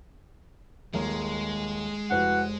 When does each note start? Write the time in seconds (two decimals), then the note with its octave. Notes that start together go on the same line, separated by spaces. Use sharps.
0.94 D#1 G#3 A#3
2.11 F1 E3 F#4 F#5